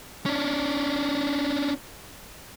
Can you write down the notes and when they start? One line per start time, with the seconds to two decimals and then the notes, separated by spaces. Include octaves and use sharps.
0.26 C#4 D4